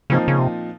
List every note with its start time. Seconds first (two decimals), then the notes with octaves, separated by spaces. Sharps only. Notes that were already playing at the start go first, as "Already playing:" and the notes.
0.10 A#2 C#3 F3 C4 D#4
0.28 C#3
0.39 C3